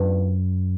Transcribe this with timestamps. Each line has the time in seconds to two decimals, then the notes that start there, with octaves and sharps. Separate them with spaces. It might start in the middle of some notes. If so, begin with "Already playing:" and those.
Already playing: F#2 B3 D4 F4 B4